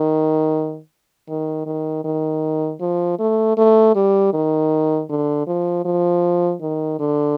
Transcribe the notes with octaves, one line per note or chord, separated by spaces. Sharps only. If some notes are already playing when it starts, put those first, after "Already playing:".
Already playing: D#3
D#3
D#3
D#3
F3
A3
A3
G3
D#3
D3
F3
F3
D#3
D3